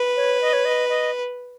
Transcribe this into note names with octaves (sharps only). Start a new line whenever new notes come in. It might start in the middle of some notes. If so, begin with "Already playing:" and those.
Already playing: B4
C#5
D#5
C#5
D#5
D#5